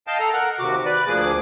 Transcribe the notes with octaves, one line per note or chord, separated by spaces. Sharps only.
D#5 F5 G5 A5
A4 A#5
A#4 F#5
D#2 C3 F#4 D6
B4 D5 F#6
D2 F3 A#3 G#4 D6